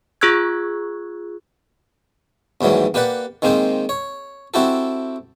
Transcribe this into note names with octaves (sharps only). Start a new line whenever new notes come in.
F4 G#4 C#6 E6 F#6 G#6
D#2 G#2 E3 F#3 G3
A#3 G4 B4 D5 F#5
D#3 G#3 A#3 C4 C5
C#5
C4 E4 F#4 G4 A4